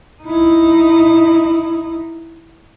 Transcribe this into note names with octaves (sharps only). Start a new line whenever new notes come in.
D#4 E4